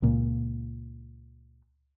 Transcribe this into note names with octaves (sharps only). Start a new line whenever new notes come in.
C#2 A#2